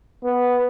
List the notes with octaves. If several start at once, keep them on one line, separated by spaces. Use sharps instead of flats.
B3